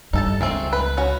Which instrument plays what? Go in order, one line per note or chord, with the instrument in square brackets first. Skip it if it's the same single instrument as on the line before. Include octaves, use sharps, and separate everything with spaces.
[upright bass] G2 [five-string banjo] D#4 A4 A5
[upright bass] C#2 [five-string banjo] G#3 A3 C4
[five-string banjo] B4
C#4 F#4